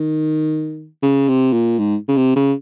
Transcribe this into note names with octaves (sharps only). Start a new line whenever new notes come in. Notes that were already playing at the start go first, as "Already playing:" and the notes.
Already playing: D#3
C#3
C3
A#2
G#2
C#3
C3
C#3